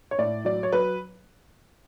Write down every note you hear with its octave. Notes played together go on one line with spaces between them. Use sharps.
C#5
A2 D5
F#3 D5
C#5
F#3 B4